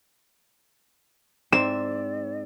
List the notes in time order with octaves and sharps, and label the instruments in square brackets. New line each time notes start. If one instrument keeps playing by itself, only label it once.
[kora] G#2 E5 [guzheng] C4 [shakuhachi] D5 [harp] E7